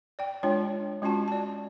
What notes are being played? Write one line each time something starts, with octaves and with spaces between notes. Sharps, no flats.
D5 G5
G#3 D4 F4 C#5 G5
G#3 C#4 F4 F#4 A5
D5 A5